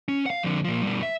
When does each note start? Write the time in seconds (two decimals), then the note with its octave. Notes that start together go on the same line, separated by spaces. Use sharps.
0.08 C#4
0.26 F5 F#5
0.43 F2 D3
0.64 A#2 F3
0.83 G2 B2
1.03 E5